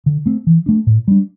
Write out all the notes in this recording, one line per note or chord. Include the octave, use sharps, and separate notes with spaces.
D3
A3 C4
E3
A3 D4
A2
G3 D4